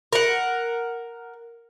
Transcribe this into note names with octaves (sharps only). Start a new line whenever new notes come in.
A#4 F#5